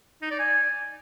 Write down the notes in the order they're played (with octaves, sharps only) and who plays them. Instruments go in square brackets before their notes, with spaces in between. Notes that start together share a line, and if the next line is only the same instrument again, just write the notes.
[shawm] D#4
D5
G#5